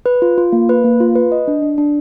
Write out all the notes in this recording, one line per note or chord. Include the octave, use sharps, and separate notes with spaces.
B4
F4
F4
A#3
B4
A#3
F4
B4
D#5
D4
D4
D4